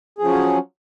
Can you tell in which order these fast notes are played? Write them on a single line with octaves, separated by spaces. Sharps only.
G#4 F3 C#4 F#3